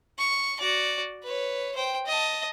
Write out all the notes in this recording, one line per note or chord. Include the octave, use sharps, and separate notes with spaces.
C#6
F#4 D5
B4 C#5
C5 G5
D#5 A5